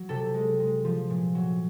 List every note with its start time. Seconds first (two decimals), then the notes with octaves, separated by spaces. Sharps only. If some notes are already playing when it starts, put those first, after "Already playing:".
Already playing: F#3
0.09 C3 A4
0.34 G#3
0.60 G#3
0.85 F3
1.10 A#2
1.35 F#3